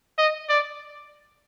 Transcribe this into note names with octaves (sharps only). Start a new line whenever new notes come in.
D#5
D5